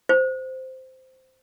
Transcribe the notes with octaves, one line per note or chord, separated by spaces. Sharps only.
C5